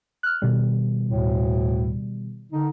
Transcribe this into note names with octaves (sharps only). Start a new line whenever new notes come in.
F6 F#6
B2 D#3 G3
D2 A2
D3 D#4